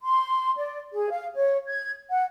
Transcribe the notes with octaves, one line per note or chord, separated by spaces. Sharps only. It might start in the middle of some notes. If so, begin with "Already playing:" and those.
C6
D5
G#4
F5
C#5
G#6
F#5